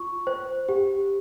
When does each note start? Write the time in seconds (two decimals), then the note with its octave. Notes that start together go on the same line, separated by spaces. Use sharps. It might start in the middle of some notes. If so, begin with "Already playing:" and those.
Already playing: F4 C#6
0.27 C5
0.69 G4